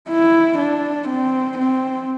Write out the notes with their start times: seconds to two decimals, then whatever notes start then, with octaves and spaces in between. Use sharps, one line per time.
0.09 E4
0.59 D4
1.09 C4
1.59 C4